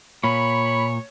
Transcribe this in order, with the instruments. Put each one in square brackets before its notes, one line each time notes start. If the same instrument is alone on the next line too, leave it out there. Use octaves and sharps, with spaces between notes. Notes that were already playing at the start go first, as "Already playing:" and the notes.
[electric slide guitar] A#2 [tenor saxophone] C#5 [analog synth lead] B5